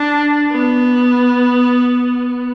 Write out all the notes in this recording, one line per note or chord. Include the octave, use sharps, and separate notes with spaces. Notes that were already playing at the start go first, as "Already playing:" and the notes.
Already playing: D4
B3